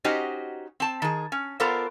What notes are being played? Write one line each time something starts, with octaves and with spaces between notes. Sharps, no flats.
C#4 D#4 F#4 G4 C5 D#5
C4 A5
D#3 G#4
C#4
B3 F4 A4 A#4 C5 D5